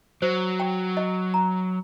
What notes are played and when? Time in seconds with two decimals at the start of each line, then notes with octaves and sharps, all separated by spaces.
0.22 F#3 C5
0.60 G5
0.97 D#5
1.34 A#5